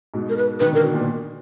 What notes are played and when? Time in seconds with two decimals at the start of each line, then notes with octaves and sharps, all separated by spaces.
0.14 G#2 B2
0.29 A#4
0.37 B4
0.59 D#3 B4
0.72 D3 A#4
0.83 B2
0.94 A#2